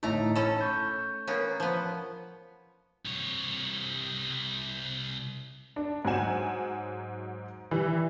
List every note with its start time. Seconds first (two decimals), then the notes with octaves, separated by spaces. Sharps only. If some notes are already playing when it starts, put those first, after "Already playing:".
0.03 G1 A2 A3 D#4 A#5
0.35 C#4 A4 A5 B5
0.61 C#6 G6
1.27 A#3 B3 C#4
1.60 F3 B3
3.05 C2 C#5
5.76 D4
6.05 G#2 F#3 F#5 G#5 E7
7.71 E3 G3